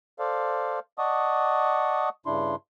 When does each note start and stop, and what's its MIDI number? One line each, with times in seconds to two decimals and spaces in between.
0.19 0.79 69
0.19 0.79 72
0.19 0.79 74
0.19 0.79 77
0.98 2.09 74
0.98 2.09 75
0.98 2.09 78
0.98 2.09 81
0.98 2.09 85
0.98 2.09 87
2.26 2.55 43
2.26 2.55 49
2.26 2.55 62
2.26 2.55 64
2.26 2.55 84